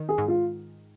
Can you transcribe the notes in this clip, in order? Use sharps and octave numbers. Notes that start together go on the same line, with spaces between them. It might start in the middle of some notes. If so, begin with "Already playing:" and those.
Already playing: D#3
G#4
G#2
F4